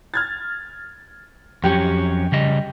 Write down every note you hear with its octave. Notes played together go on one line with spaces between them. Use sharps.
F6 G#6 A6
F2 F#3 C#4 G4
C#3 G3 D#5